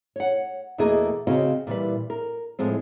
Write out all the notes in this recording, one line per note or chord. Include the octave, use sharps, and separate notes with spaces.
C#5 F#5
E2 B2 A3 A#3 G#4 D#5
C#3 C4 F#4 D#5 F5
A#2 E3 G3 B4
A#4
A2 F3 G#3 C4